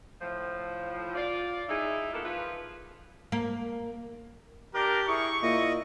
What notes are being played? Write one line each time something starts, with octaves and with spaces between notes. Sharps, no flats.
A2 F3
F4 D5
D#4 E4 G#4
E3 G#3 A#3 B3 F4 A4
F3 F4 B4
A#3
D4 G4 A#4 G5
E4 G#4 C#6
A#2 E4 D#5